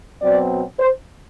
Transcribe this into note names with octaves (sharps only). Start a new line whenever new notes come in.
B2 F#3 C4 D5
C5